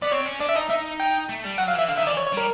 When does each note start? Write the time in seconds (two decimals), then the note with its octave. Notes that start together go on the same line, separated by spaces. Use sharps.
0.02 B3 D5
0.12 C4 C#5
0.26 C#4
0.40 D4 D5
0.49 E5
0.55 D#4 D#5
0.70 D#4 E5
1.00 G5
1.29 A3
1.44 G3
1.58 F#3 F#5
1.68 F5
1.74 E3 E5
1.88 D3 F5
1.98 D#3 E5
2.07 E3 D5
2.17 C#5
2.27 C#5
2.33 G3 A#4